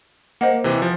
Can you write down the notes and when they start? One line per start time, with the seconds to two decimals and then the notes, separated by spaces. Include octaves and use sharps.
0.41 A#3 C5 D#5 F#5
0.64 C3 E3
0.82 F3